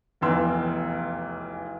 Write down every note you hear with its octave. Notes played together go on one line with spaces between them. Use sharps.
F1 B1 E2 E3 C6 E6